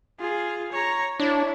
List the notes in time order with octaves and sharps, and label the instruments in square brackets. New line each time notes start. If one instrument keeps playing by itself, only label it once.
[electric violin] F4 G#4
C#5 A#5
[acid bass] D4 [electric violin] E4 [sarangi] C#5